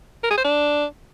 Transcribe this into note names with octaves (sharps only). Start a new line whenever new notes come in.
A#4
G#4
C5
D4